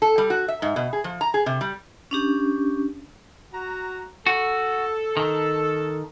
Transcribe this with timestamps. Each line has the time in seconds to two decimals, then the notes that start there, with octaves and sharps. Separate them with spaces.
0.02 A4
0.18 G3
0.30 F#4
0.48 E5
0.62 G#2
0.76 B2
0.93 G#4
1.04 F3
1.21 A#5
1.34 G#4
1.46 C3
1.61 G3
2.11 C#4 D4 G4
3.53 F#4 A#5
4.26 F#4 A4
5.17 D#3